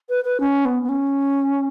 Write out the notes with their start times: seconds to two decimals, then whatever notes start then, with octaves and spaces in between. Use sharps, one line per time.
0.09 B4
0.24 B4
0.40 C#4
0.65 B3
0.83 B3
0.89 C#4